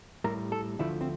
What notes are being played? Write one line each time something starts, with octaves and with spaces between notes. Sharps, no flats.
A2 G3 A#4
A4
D2 D3 F3 A3 E4
C4